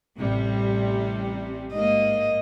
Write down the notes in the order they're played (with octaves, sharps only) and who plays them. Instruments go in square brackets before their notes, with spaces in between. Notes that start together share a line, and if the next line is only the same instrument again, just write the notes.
[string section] A1 C3 G3
[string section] G#2 A#3 [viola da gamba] D#5